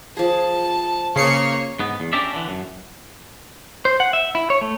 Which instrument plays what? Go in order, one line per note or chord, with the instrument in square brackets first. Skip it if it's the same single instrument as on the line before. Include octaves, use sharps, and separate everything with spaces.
[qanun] F3 G#4 [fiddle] A5
[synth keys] C#3 C7 C#7 [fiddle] A#3 C#5
[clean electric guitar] G#2 B3
E2
C#4 D4 G4 A#4 D5 E5
D3 E3
F#2
[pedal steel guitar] C5
F#5
E5
E4
C#5
A3